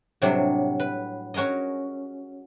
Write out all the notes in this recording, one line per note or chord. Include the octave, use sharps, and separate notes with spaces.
A2 C3 F#3 G3 D4
B4
C#4 F#4 G#4 A#4 D#5